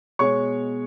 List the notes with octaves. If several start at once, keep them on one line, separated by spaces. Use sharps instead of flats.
B2 G#3 B3 C#5 C#6